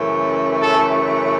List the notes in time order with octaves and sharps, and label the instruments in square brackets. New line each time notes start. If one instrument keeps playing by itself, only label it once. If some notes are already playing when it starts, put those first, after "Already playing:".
Already playing: [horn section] F#2 C#3 E3 A3
A4